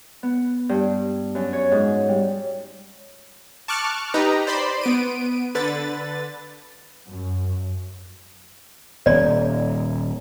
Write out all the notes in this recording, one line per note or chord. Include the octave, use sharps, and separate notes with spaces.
B3
G2
F#2
C#5
G#2
G3
A5 C#6 D6 F6 F#6
D#4 G4 B4 A#5
C5 D5 B5 C6
B3 D7 D#7
D3 B4 A6
F#2
D#1 C#5 D5